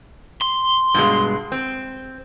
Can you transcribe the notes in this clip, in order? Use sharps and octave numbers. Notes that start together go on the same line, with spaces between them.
C6
G2 B2 G#3
C4